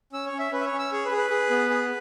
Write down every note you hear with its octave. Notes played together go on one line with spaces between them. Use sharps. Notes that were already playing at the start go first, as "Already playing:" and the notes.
C#4 E6
C#5
C#4
E5
C#4 B4
E5
C#5
C#4
E6
G#4 C#5
B4
G#4
B4
G#4
B3
G#4